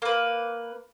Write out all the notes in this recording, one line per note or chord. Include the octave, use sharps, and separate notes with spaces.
A#3 B4